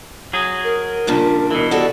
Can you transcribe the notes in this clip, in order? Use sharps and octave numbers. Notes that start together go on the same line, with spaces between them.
F#3 G#4
A#4
G2 A#2 C#3 D4
B2 E3
F#4 G4 A4 D5